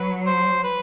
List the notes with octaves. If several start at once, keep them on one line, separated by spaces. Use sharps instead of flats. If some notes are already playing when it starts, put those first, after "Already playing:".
Already playing: F#3 B4
C5
B4